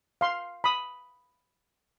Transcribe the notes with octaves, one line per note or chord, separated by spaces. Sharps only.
F5 C6
B5 D#6